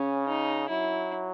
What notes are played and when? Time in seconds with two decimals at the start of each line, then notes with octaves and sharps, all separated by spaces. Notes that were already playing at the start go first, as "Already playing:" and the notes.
Already playing: C#3 C#4
0.28 D#4
0.69 F#3 E4